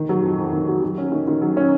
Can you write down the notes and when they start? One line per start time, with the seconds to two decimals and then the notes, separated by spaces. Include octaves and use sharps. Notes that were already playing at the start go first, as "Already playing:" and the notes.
Already playing: D#3
0.09 F#3
0.23 F2
0.38 F2
0.53 D#3
0.68 F#3
0.83 F#3
0.98 C#4
1.12 D#3
1.28 D#3
1.42 F#3
1.57 C#4